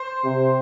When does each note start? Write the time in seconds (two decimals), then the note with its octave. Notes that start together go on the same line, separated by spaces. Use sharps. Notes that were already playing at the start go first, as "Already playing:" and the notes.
Already playing: C5
0.24 C3